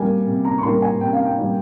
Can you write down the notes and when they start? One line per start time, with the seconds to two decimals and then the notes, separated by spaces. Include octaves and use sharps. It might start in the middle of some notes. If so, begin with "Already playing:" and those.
Already playing: G3 A#3 G#5
0.27 C3
0.45 A#5
0.58 C#6
0.63 G3 A#3 C6
0.82 G#5
1.01 C3 G5
1.13 F5
1.25 G5
1.38 G3 A#3